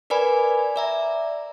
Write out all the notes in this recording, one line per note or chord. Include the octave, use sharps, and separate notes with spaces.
A#4 B4 D5 G#5 B5
D5 E5 A#5